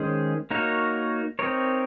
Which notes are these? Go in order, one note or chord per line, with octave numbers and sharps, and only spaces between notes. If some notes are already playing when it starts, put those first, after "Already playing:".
Already playing: D#3 G#3 C#4 G#4 C5
A#3 D#4 F#4 A#4 C#5
C4 D#4 A#4 C#5